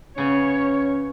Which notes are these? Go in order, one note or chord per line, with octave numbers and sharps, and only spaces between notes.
C#3 B3 C#4 C#5 G#5